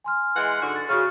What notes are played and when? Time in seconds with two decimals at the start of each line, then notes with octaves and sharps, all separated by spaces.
0.04 G#5 C6 F6
0.36 E3 G#3 F#5
0.61 G#2 D3 F#4
0.76 A6
0.89 C#3 F#4 C#6 F6